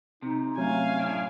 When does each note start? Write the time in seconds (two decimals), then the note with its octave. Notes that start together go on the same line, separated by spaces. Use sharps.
0.22 C3 D#4
0.57 F#3 A3 C#4 F5 G#5
0.99 A2 D4